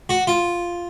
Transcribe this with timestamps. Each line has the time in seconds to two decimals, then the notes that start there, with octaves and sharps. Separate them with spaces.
0.09 F#4
0.27 F4